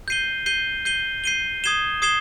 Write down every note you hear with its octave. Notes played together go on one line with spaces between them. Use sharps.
G6 C7 D#7 G7
G6 C7 D#7 G7
G6 C7 D#7 G7
G6 C7 D#7 G7
D#6 G#6 C7 E7 G7
D#6 G#6 C7 E7 G7